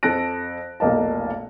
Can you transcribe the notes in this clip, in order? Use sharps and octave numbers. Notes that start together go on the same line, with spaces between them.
F2 A4 F#6 A#6 D7
F1 B1 A#3 D#5 A5